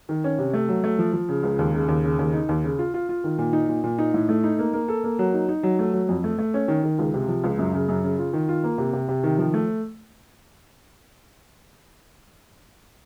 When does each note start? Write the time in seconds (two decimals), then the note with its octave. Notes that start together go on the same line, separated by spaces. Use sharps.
0.09 D#3
0.24 C#4
0.39 C3
0.53 A3
0.69 F#3
0.84 A3
0.99 F3
1.13 F3
1.29 C#3
1.43 C#2
1.59 D#2
1.74 C#3
1.88 D#2
2.04 C#3
2.19 D#2
2.33 D#4
2.49 D#2
2.64 C#3
2.79 F4
2.94 F4
3.09 F4
3.24 D#3
3.38 A#2
3.53 D#4
3.69 A#2
3.84 A#2
3.99 D#4
4.14 A2
4.29 A3
4.44 D#4
4.59 A#3
4.73 A#3
4.88 A4
5.04 A#3
5.19 F#3
5.34 D#4
5.49 D#4
5.63 F#3
5.79 A3
5.93 F#3
6.09 F2
6.24 A3
6.38 A3
6.54 C#4
6.68 D#3
6.83 D#3
6.99 C#2
7.14 C3
7.29 F3
7.44 C#2
7.58 F#2
7.74 C#3
7.88 F#2
8.04 C#3
8.19 F4
8.33 D#3
8.49 F4
8.64 A#3
8.78 C3
8.93 C3
9.09 C3
9.23 D#3
9.38 F3
9.54 A3